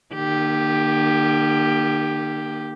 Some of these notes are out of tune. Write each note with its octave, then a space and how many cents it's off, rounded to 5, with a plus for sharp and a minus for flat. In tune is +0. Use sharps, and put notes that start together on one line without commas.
D#3 -45 A#3 +0 G4 +0